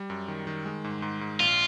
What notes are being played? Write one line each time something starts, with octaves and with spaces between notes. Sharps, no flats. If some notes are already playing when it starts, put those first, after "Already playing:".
Already playing: G3
F#2
D#3
D#3
G#3
G#2
G#2
G#2
A#1 F4